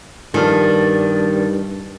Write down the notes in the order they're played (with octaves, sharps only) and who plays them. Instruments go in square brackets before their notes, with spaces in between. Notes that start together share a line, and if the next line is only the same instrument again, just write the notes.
[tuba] G2 [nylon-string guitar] D#3 [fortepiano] F3 A4 F6 [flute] D5